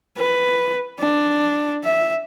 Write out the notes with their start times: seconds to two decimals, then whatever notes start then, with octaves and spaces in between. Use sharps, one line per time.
0.17 B4
0.99 D4
1.84 E5